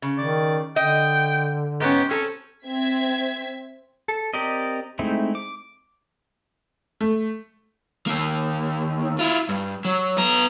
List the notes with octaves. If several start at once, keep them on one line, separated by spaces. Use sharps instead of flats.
C#3
D#3 D5
D3 D#5 G5
G#2 B3 C#4 G4
C4 C#4 G#4 A4
C4 E5 G#6 B6
A4
C4 G4 A#4 D5 D#5
G#3 A3 C4 D#4 E4
D6
A3
D#2 A#3
E4 F4
G2
F#3
B3 A#5